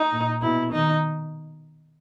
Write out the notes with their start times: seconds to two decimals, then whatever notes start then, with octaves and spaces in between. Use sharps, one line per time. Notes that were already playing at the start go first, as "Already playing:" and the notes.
Already playing: D#4
0.13 A#2
0.42 B2 E4
0.72 D#3 D#4